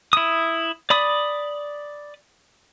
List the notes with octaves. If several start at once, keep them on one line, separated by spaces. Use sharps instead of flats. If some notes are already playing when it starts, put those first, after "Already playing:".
E4 D#6
D5 B5 D#6